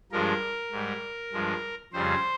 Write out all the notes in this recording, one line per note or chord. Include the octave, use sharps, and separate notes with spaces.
G2 F3 G#3 A#4
G#2 G3
G2 F3 G#3
F2 C#3 G3 C5